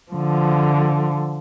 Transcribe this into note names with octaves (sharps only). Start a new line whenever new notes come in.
D3 F3